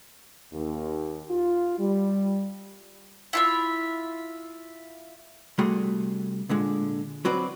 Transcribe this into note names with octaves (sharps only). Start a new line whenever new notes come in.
D#2
F4
G3
E4 F4 E5
C2 G3 A3 F#4 G#4 C6
A#2 D3 G#3
F#3 C4 F#4 B4 C5 D5